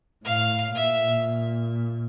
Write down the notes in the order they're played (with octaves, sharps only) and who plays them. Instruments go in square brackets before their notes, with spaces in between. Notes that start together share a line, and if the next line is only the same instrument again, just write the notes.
[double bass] A2 [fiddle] F5
[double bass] A#2 [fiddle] E5